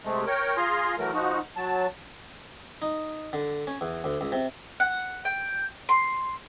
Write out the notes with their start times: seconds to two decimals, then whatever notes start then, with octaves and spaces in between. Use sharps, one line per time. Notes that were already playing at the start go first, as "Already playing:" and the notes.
0.05 C3 G#3 A3
0.27 A#4 C#5 G5
0.57 F4 G#4 G#5 A#5 C6
0.99 E3 F#3 A3 A#4
1.13 F3 D#4 F#4
1.56 F#3 A5
2.82 D#4
3.33 D3
3.67 C#4
3.81 E2
4.04 D2
4.21 C#2
4.32 C3
4.80 F#5
5.25 G5
5.89 C6